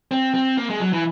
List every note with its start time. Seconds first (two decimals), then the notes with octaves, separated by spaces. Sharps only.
0.11 C4
0.34 C4
0.57 A#3
0.70 G#3
0.80 F#3
0.93 E3